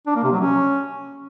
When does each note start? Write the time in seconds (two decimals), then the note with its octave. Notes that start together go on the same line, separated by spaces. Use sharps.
0.07 D4
0.15 A#3
0.24 C3
0.32 F#3
0.41 C#4